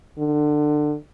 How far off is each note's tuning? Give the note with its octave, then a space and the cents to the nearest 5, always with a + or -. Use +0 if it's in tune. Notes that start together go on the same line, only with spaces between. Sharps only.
D3 +25